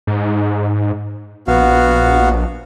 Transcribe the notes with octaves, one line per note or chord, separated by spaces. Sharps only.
G#2
A#1 B3 F#4 F5